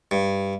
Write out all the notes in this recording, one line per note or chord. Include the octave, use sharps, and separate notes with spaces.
G2